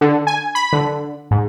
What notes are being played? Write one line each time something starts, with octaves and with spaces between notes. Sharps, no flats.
D3
G#5
B5
D3
G#2